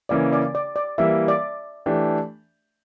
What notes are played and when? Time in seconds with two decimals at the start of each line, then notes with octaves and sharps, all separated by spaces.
0.09 C#3 E3 A#3 C#4 D5
0.33 D5
0.55 D5
0.76 D5
0.98 E3 G3 A#3 E5
1.28 D5
1.86 E3 A3 D4 G4